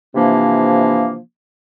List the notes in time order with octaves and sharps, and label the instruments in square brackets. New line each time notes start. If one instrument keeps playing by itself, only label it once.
[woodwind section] C3 E3 F3 A#3 D4